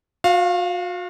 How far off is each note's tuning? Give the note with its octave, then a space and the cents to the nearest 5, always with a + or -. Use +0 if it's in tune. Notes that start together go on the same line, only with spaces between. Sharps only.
F#4 -40 F5 +0